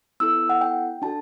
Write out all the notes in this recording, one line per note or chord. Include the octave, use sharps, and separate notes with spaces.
B3 E4 A4 E6
F#5
G5
D4 F#4 A4 A5